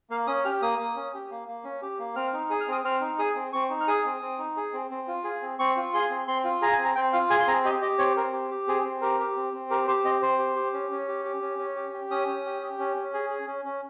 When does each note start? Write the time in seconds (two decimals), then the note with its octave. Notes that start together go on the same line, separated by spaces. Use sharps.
0.10 A#3 F5
0.27 C#4 D#6
0.45 G4 F6
0.62 A#3 D#6
0.79 A#3
0.96 C#4
1.14 G4
1.31 A#3
1.48 A#3
1.64 C#4
1.82 G4
1.99 A#3
2.16 C4 F6
2.33 D#4
2.50 G#4 D#6
2.61 F6
2.68 C4 D#6
2.84 C4 F6
3.01 D#4
3.19 G#4 D#6
3.36 C4
3.53 C4 C#6
3.70 D#4
3.81 F6
3.88 G#4 D#6
4.05 C4
4.22 C4
4.39 D#4
4.57 G#4
4.74 C4
4.91 C4
5.07 F4
5.24 G#4
5.42 C4
5.59 C4 C#6
5.77 F4
5.94 G#4 C6
6.10 C4
6.28 C4 C6
6.44 F4
6.62 G#4 A#5
6.73 G#5
6.78 C4
6.85 A#5
6.96 C4 G5
7.13 F4 F5
7.30 G#4 G#5
7.40 C6
7.47 C4 A#5
7.64 G4 D#5
7.82 G4 D#5
7.98 C4 C#5
8.17 C4 A#4
8.33 G4
8.51 G4
8.68 C4 G#4
8.85 C4
9.02 G4 A#4
9.20 G4
9.36 C4
9.53 C4
9.70 G4 A#4
9.87 G4 C5
10.04 C4 D#5
10.21 C4 C5
10.39 G4
10.56 G4
10.73 C#4
10.91 C#4
11.08 G4
11.25 G4
11.42 C#4
11.59 C#4
11.76 G4
11.93 G4
12.10 C#4 D#6
12.28 C#4
12.45 G4
12.62 G4
12.79 C#4
12.97 C#4
13.14 G#4
13.30 G#4
13.47 C#4
13.65 C#4